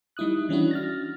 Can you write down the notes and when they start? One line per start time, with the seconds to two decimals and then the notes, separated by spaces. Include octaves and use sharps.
0.17 G3 D#4 E4 D#6 F#6
0.49 E3 C#4 D4 E4 F#4
0.71 F6 A6 A#6